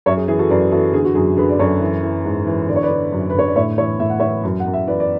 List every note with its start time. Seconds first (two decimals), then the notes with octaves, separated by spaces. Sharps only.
0.06 F#2 C#5 E5
0.17 G#4
0.28 E3 G#4
0.39 F#4 A4
0.50 F#2 B4 D5
0.72 E3 F#4 A4
0.93 D3 G#4
1.05 F#4
1.15 F#2 G#4
1.37 D3 G#4 B4
1.49 D5
1.59 F#2 A4 C#5
1.81 E3
2.03 E3
2.25 G#2
2.47 E3
2.69 D3 D5
2.76 C#5
2.83 B4 D5
2.90 D3
3.12 F#2
3.30 B4
3.34 D3 C#5
3.47 D5
3.56 A2 C#5 E5
3.78 E3 C#5 E5
4.00 A2 E5
4.10 F#5
4.20 E3 C#5 E5
4.43 F#2
4.60 F#5
4.66 F#2
4.73 E5
4.87 E3 B4 D5
5.00 D5